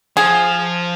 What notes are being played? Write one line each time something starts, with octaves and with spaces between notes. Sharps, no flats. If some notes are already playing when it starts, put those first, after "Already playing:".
F3 G#4